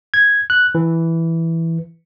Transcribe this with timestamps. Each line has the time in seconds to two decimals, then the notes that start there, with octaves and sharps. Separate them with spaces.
0.14 G#6
0.50 F#6
0.75 E3